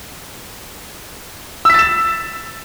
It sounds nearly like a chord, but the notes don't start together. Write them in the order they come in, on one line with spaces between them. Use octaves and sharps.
E6 B6 A6 E7